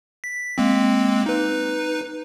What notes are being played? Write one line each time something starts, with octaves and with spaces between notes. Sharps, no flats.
B6
G#3 A#3 C4
D#4 B4